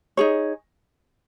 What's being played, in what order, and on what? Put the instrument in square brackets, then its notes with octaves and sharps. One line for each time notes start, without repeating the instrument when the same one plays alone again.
[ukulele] D#4 G#4 C#5